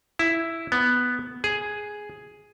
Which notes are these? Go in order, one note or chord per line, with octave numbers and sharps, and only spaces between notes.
E4
B3
G#4